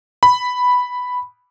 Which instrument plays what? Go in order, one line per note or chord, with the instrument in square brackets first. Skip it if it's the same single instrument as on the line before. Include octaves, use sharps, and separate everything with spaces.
[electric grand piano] B5